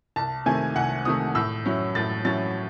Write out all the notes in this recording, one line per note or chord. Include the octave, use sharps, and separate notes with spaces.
C2 A5
C3 D#3 A3 G#5
C2 F#5
C3 D#3 A3 D#6
A2 E6
F#3 C#4 E4
A2 A6
F#3 C#4 E4 A6